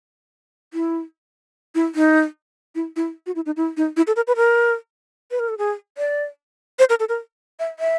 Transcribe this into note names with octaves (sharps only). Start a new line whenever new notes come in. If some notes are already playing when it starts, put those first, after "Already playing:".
E4
E4
D#4
E4
E4
F#4
E4
D#4
E4
D#4
E4
A4
A#4
B4
A#4
B4
A#4
A4
G#4
D5
C5
A#4
A4
A#4
E5
E5